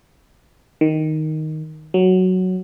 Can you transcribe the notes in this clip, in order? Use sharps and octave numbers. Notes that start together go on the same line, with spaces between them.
D#3
F#3